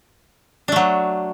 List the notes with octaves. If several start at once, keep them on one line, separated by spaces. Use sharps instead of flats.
F#3 A3 D4